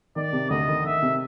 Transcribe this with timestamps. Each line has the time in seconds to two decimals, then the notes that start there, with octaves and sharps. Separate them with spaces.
0.16 D#3 D5
0.33 C3
0.50 D2 D#5
0.68 D#3
0.84 D#3 E5
1.02 C3